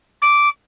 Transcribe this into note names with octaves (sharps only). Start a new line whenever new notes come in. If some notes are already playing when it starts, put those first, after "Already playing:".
D6